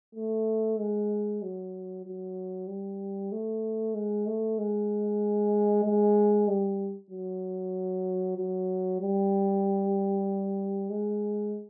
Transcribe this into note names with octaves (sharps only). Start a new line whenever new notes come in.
A3
G#3
F#3
F#3
G3
A3
G#3
A3
G#3
G#3
G3
F#3
F#3
G3
G#3